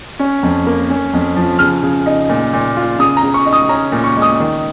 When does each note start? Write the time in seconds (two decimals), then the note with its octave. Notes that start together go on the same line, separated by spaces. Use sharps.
0.19 C#4
0.43 F2
0.67 A#3
0.90 C#4
1.13 F2
1.36 F3
1.59 C#3 F6
1.83 C#3
2.06 D#4
2.30 A#2
2.53 A#2
2.77 F4
2.99 C#3 D#6
3.17 A#5
3.23 C#3
3.34 C#6
3.46 D#4
3.53 D#6
3.69 C#4 A#5
3.92 A#2
4.04 C#6
4.17 G#3
4.22 D#6
4.40 D#3